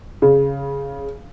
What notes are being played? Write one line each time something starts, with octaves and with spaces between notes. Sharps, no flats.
C#3